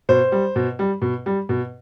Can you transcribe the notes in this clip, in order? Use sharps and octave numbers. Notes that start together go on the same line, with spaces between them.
B2 C5
G3
B2
G3
B2
G3
B2